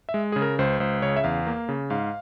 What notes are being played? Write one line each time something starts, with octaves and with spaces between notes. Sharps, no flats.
E5
G#3
C#3 G#4
A#4
C#2 C5
C#2 C5
C#3 C#5
E5
E2 F5
A#3
C#3
G#2 F5